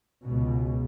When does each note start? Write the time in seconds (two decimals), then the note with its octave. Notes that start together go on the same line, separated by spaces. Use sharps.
0.23 C#2 B2